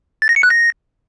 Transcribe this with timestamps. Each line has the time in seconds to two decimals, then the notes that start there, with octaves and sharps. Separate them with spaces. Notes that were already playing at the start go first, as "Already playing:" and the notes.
0.22 A6
0.29 A#6
0.36 C#7
0.43 F#6
0.50 A#6